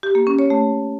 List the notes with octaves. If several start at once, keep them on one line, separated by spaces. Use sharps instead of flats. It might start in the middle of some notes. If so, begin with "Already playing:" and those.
G4
A#3
C#4
C#5
A3